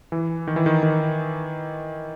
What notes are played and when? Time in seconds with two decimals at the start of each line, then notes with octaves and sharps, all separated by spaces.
0.12 E3
0.47 D#3
0.56 E3
0.66 D#3
0.83 D#3